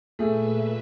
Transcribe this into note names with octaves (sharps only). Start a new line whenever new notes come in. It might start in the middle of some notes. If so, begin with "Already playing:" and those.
A#2 A3 G#4 B4 E5